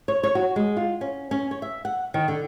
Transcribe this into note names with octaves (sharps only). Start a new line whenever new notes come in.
C#5
C#5
F#4
G#3
F4
C#4
C#4
C#5
E5
F#5
D#3
D3